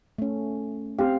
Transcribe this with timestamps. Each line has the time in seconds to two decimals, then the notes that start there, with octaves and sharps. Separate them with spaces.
0.18 A3 C#4
0.99 C4 G4 F5